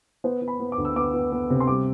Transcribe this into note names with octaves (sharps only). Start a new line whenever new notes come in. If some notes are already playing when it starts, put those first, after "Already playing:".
B3 C5
B3
B5
B3
D6
D2
E6
B3 D6
B3
B3
C3
C6
G3 D6